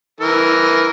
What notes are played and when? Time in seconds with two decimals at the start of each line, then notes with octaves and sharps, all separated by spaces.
0.20 E3 A#4